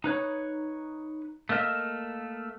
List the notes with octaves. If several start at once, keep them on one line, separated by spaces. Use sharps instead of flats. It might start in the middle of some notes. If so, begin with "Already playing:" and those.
D#4 B4 C#5
A3 A#3 A#4 D#5 E5